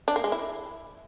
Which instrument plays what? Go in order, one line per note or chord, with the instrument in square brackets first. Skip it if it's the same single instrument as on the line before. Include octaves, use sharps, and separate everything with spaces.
[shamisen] D4
A#3
G#3
E4